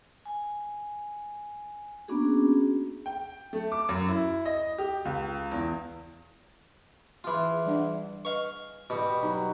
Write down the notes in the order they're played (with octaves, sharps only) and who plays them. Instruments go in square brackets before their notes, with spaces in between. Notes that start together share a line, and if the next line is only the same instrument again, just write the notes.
[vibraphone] G#5
A#3 B3 C#4 D4 F#4 G#4
[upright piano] G5
A3
D6
F#2
E4
D#5
G4
C#2
E2
[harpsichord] E3 F4 [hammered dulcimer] G#4
[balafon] G3 D4 F#5
[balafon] B4 D#5 [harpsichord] F5 C#6
[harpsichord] B2 [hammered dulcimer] G3 G4 D#5 [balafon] F#4
[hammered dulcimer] F#3 [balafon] D#4